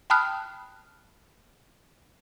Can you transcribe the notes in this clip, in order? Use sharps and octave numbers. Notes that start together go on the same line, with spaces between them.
G5 A5 B5 D#6 F6 F#6